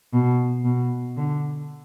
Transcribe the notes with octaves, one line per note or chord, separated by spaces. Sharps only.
B2
B2
D3